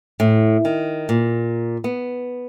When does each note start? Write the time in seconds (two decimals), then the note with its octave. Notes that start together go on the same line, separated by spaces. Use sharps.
0.20 A2
0.65 D#3
1.09 A#2
1.84 B3